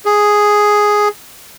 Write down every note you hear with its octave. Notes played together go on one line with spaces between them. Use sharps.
G#4